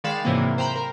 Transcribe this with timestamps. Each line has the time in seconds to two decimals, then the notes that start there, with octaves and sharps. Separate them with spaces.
0.04 D#3 G#3 D5 F5 B5 E7
0.25 G#2 C3 E3 F#3 A#3
0.58 C5 G5 A#5 B5
0.76 A#4